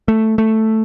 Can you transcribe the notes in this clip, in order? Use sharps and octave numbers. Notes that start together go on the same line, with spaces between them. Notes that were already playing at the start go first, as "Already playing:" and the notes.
A3
A3